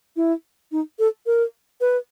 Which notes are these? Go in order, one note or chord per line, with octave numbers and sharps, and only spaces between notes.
E4
D#4
A4
A#4
B4